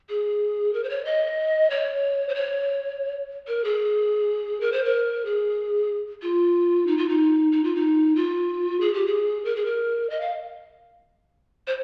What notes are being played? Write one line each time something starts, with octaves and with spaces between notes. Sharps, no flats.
G#4
A#4
C5
C#5
D#5
C#5
C5
C#5
A#4
G#4
A#4
C5
A#4
G#4
F4
D#4
F4
D#4
D#4
F4
D#4
F4
G#4
G4
G#4
A#4
G#4
A#4
D#5
F5
C5